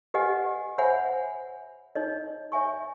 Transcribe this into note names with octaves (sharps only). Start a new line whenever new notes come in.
G4 B4 D#5 F#5 G#5
C5 C#5 E5 F#5 G#5 B5
D#4 C#5 D#5
C#5 E5 G#5 C#6